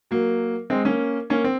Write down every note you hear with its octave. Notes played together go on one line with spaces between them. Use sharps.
F#3 A#3
G#3 C4
A#3 C#4
A#3 C#4
C4